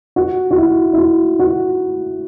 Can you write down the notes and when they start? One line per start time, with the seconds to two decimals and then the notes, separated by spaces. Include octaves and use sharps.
0.16 F#4
0.51 F#4
0.57 E4
0.93 E4
0.98 F#4
1.39 F#4